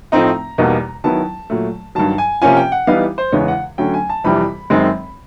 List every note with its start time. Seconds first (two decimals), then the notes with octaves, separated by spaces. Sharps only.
0.12 A2 F3 A3 C4 D#4 A#5
0.58 E2 B2 G3 A#3 D#4
1.04 D#3 F#3 B3 E4 A5
1.50 A#2 F#3 A3
1.95 G2 D#3 F#3 A5
2.18 G#5
2.42 C3 F3 A#3 C#4 F4 G#5
2.57 G5
2.72 F#5
2.87 E3 G3 B3 D#4 F5
3.18 C5
3.32 E2 C#3 E3 G#3 B3 C#5
3.48 F#5
3.78 D3 F#3 A3 C#4 G5
3.94 G#5
4.09 A5
4.24 F2 C3 E3 G3 B5
4.70 F#2 D#3 G#3 C4